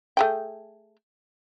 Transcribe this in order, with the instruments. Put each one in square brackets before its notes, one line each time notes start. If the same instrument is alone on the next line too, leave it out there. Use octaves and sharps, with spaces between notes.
[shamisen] A3 G#4 G5